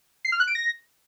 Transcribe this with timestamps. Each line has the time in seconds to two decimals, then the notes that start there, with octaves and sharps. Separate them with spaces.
0.25 C7
0.32 F6
0.40 F#6
0.47 D7
0.55 A#6